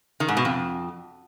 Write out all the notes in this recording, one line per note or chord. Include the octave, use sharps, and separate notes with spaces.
D#3
G#2
B2
F2